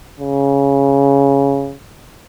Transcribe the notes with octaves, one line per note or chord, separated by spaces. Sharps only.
C#3